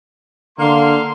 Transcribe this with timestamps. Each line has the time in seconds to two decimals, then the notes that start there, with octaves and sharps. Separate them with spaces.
0.59 D3 A#3 F5 C6